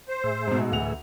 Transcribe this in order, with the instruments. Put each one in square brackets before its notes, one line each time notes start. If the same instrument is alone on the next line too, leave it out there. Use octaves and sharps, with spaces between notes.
[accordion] C5
[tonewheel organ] A2 G#4 E5
[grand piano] G#2 B2
[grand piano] D2 F#5 F7 [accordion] E3